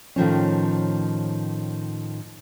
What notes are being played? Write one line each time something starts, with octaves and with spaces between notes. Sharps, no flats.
A2 D#3 F3 C#4